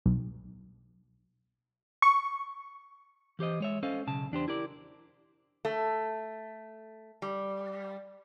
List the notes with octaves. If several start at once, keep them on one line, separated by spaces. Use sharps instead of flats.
B1
C#6
E3 G4 C5 D#5
G#3 C#5 E5
C#4 A4 C5 D#5 F5
B1 C#3 A5
E2 D4 G4 C5
E4 G4 A#4 D5
A3
G3